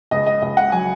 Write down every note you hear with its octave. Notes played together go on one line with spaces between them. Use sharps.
C#2 D#5
D#5
C#2 D#5
F#5
F#3 G#5